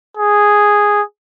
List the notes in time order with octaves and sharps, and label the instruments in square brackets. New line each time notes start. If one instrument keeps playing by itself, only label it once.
[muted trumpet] G#4